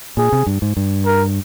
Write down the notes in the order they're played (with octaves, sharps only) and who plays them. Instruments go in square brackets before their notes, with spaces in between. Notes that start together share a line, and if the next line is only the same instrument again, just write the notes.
[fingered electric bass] A#2 [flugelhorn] G#4
[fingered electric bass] C3
G2
G#2
G2
[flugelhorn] A#4